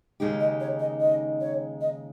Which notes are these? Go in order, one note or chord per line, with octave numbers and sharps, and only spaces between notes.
D#2 C#3 G#3 D#4 G4
D#5
C#5
D#5
D#5
C#5
D#5